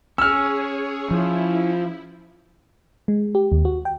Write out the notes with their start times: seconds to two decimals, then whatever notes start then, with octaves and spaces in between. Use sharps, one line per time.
0.18 C#4 G#4 C#5 E6 F6
1.11 F3 E4
3.08 G#3
3.35 G4
3.52 D#2
3.65 F#4
3.85 G5